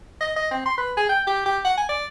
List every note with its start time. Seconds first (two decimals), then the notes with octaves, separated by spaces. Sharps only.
0.21 D#5
0.36 D#5
0.51 C4
0.66 C6
0.78 B4
0.97 G#4
1.09 G5
1.27 G4
1.46 G4
1.65 F#5
1.77 G#5
1.89 D5